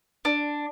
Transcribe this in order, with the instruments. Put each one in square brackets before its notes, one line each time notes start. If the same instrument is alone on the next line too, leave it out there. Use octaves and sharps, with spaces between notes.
[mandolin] D4